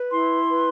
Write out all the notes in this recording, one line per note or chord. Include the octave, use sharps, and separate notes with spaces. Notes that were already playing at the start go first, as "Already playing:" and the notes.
Already playing: B4
E4 C6
B4